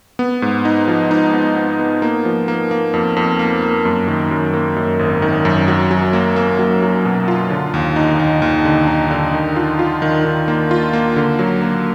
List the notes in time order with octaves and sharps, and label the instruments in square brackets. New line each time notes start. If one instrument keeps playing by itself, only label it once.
[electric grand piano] B3
G#2
D#4
F3
D#4
B3
B3
B3
A#3
F3
A#3
A#3
F2
F2
A#3
A#3
F#2
D#3
F#2
A#3
F#2
G#1
D#3
F#2
F#3
F#3
A#3
A#3
F#3
F#3
B2
F4
D3
D#2
D#4
D#2
D#2
D3
D#4
D3
D#3
F4
F4
D#3
D#3
A#3
F4
A#3
D3
F#3
A#3